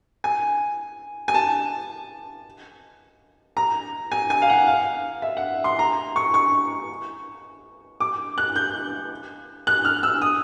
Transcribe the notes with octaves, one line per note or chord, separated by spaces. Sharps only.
G#5
G#5
A5
A#5
G#5
G#5
F5
F#5
F5
E5
F#5
C6
A#5
C#6
C#6
D6
F#6
G6
F#6
F6
E6
D#6